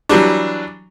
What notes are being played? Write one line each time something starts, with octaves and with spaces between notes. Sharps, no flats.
E3 F#3 G3 D4